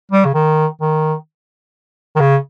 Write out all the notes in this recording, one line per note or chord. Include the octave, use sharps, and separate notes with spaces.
G3
C#3
D#3
D#3
D#3
C#3